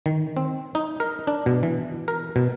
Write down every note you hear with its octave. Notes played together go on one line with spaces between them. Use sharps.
D#3
C4
D#4
A#4
D4
B2
E3
A#4
B2